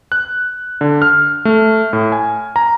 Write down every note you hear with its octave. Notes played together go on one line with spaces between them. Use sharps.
F#6
D3
F6
A3
A2
G#5
A#5